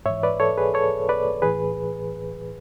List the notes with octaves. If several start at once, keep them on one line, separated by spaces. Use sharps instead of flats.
G#2 E3 C#5 E5
B4 D5
A4 C#5
G#4 B4
A4 C#5
B4 D5
A2 E3 G#4 B4